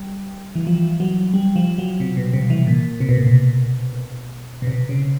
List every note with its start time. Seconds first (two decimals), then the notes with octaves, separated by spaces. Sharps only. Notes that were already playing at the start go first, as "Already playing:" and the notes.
Already playing: G3
0.55 E3
0.67 F3
1.00 F#3
1.34 G3
1.56 F3
1.78 F#3
2.00 C3
2.17 B2
2.33 C3
2.50 E3
2.67 A#2
3.00 C3
3.09 B2
3.18 A#2
3.27 B2
4.62 B2
4.67 C3
4.89 C#3